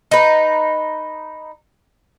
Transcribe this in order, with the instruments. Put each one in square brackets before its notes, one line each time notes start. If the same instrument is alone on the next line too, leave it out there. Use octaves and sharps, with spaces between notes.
[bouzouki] D#4 B4